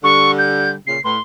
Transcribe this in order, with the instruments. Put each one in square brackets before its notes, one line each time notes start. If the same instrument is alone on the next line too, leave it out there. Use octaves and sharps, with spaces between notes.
[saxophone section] D3 G3 [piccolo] C#6
[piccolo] G6
[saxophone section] A#2 C#3 [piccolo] C7
[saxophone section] A2 B4 [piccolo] C6